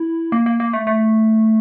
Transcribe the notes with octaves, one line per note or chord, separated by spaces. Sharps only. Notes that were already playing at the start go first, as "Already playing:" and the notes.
Already playing: E4
A#3
A#3
A#3
A3
A3